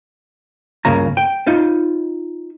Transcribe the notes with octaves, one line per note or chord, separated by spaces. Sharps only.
C#2 G2 C#3 A#3 A#5
G5
D#4 F4 C5